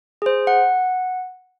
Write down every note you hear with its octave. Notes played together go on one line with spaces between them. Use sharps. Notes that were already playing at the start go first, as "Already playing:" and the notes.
G#4 C5
F#5